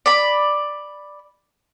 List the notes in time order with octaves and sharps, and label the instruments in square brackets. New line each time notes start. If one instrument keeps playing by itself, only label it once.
[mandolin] D5 B5